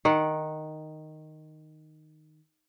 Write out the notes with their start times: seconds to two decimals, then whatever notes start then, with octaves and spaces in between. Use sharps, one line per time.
0.05 D#3 F#5